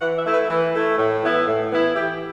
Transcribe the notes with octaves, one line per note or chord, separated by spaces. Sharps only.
E3 F#5
E5
A3 E4
B4
E3
A3 E4
A2
E3 B3 E4
A2
E3 B3 E4
E3 G4